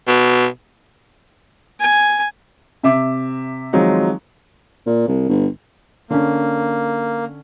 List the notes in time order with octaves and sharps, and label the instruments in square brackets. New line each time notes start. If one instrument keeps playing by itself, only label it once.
[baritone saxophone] B2
[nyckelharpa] G#5
[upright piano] C3 E5 D6
D#3 F3 F#3 G#3 C4 D#4
[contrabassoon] A#2
C2
G1
[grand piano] D3 C#4 [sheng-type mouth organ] A#3